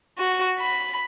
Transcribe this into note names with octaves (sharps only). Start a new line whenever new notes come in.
F#4
B5